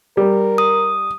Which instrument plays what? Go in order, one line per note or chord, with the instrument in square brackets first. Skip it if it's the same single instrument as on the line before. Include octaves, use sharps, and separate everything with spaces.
[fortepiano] G3 [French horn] A#4
[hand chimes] D#6